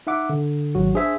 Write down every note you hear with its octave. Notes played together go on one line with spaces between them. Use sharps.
D#4 E5 F#5 D6
D3
G#1 F#3 F#4
D4 G#4 C5 E5 G#5